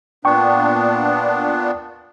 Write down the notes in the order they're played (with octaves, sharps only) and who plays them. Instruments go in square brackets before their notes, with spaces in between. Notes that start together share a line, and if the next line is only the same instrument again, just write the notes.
[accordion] A#2 B3 D4 [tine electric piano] G5 C#6